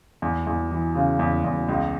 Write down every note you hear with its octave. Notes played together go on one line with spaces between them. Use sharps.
E2
E2
E3
C#3
E2
E2
C#2